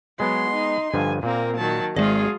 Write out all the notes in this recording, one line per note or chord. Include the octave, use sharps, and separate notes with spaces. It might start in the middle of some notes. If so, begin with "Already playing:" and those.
F#3 G#3 B3 C6
D#4
G2 D3 F3 G#5
A#2 A#3 C4 A#4
D#3 F#3 A5
G#1 F#3 G#3 F4 G#4 D5